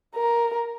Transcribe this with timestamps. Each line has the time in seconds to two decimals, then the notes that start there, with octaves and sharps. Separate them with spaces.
0.15 A#4